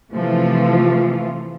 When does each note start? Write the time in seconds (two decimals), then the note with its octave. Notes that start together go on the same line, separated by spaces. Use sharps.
0.12 C3 E3 F3 A3 F4